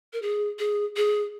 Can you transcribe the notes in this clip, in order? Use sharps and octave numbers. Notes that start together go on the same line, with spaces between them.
A#4
G#4
G#4
G#4